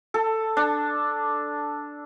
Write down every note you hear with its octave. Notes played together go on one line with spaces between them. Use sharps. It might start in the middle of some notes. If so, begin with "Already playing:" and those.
A4
D4